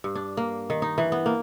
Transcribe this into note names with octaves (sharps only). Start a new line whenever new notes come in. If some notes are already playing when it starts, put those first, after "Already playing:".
G2
D4
A#3
D#3
D#4
E3
B3
A#3